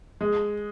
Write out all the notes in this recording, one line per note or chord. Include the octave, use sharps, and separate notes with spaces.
G#3